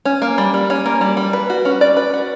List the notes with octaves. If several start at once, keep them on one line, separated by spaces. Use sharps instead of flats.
C#4
A#3
G3
G3
C#4
A#3
G3
G3
B4
F#4
C#4
D5
B4
F#4